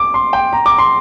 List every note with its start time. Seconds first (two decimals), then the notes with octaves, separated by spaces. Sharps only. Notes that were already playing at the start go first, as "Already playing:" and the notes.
Already playing: D6
0.14 C6
0.33 G5
0.53 A#5
0.66 D6
0.78 C6